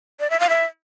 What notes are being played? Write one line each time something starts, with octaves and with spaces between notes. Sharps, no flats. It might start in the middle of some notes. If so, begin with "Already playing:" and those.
D5
E5
F5
E5